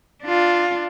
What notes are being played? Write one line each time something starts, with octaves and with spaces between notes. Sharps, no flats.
D4 F4